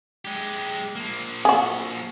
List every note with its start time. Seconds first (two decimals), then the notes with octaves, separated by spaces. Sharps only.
0.25 G#3 G4
0.95 F3 A#3
1.45 F#4 G#4